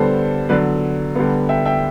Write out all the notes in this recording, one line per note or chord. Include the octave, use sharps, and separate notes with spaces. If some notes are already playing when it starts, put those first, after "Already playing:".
Already playing: D3 G3 B3 A4 C5
D3 F#3 B3 B4 D5
D3 G3 B3
E5 G5
E5 G5